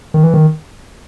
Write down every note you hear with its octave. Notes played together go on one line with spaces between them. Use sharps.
D#3
E3
D#3